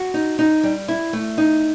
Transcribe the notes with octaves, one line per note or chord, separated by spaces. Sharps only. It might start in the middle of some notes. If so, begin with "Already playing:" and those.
Already playing: F#4
D#4
D#4
G3
E4
A3
D#4